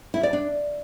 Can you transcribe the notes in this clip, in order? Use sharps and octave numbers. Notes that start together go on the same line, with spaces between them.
E4
D5
D4